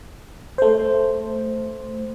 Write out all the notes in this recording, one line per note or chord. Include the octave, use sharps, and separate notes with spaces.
A3 C5